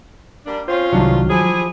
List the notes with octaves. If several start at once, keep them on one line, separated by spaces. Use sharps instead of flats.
G3 A#3 D4
C4 C#4 F4 C5
C2 G2 D#3 F#3 D4
F3 E4 G4 G#4